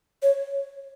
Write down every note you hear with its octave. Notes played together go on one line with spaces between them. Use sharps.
C#5